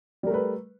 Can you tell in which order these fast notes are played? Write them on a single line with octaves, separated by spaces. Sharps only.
G3 A#4 A3 B4